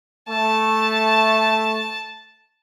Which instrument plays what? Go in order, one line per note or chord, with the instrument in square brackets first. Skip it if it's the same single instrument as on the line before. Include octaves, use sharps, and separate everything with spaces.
[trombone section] A3 [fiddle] A5